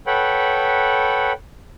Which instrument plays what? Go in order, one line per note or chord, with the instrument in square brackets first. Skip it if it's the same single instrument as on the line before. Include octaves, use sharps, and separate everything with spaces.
[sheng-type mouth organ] A4 B4 C#5 F#5 G5 B5